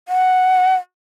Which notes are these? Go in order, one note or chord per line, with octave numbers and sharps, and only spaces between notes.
F#5